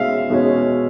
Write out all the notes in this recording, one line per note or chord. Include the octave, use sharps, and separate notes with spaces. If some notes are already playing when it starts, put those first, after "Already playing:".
Already playing: B2 G#3 C#4 E5 F5
B2 G#3 C#4